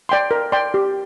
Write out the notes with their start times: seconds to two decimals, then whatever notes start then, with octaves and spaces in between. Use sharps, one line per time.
0.09 D5 G5 C6
0.31 A#4
0.52 D5 G5 C6
0.74 G4